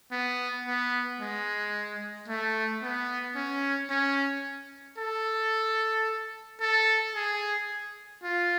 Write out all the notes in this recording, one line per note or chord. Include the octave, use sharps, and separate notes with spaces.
B3
B3
G#3
A3
B3
C#4
C#4
A4
A4
G#4
F4